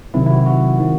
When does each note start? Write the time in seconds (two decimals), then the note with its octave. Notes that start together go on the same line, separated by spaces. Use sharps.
0.14 C3 D#3 F#3 C4 E4
0.26 E4
0.31 F#4
0.46 F#4
0.78 D#3 G#3 C4